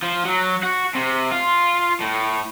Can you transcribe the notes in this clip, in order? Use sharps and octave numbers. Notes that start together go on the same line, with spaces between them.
F3
F#3
F#4
C3
F4
A2